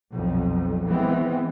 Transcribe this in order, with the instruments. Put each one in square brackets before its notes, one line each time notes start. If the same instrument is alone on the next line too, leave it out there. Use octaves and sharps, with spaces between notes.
[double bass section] B1 F2
E3 G#3 B3 C4